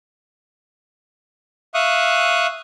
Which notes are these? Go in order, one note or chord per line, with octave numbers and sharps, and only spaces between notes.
E5 F5 C#6 D#6 F#6